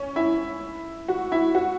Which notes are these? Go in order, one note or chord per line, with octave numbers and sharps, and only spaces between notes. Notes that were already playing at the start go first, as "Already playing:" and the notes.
Already playing: C#4
E4
F#4
E4
F#4